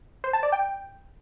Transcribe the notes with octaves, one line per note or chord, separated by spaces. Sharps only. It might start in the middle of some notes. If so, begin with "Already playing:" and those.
C5
A5
D5
G5